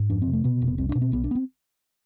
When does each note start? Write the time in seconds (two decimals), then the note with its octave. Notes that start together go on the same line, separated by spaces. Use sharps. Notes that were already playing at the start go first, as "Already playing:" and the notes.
Already playing: G#2
0.10 F2 D4
0.22 C4
0.28 C3
0.33 A3
0.44 B2 B3
0.62 F1
0.67 B3
0.78 C2 C4
0.89 D4
0.95 B2
1.01 C4
1.12 B1 B3
1.24 D4
1.31 B3
1.35 C4